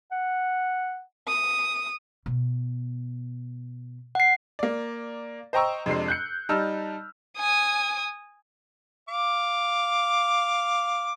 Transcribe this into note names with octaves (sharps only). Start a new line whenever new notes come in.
F#5
D#6
B2
F#5 C7
A#3 D5
C5 D#5 G5 A#5 C#6 E6
F2 C3 G#3 D4 C7
F#6 G6 C#7
G3 D#4 A5 E6 F6
G#5 D#6
F5 D6